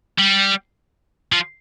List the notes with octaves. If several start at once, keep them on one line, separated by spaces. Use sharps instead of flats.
G3
F3